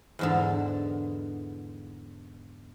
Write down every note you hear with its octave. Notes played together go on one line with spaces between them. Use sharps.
E2 G#2 D3